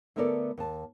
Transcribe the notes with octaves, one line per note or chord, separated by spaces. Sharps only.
D3 A3 B3 A4 A#4 D5
D#2 A5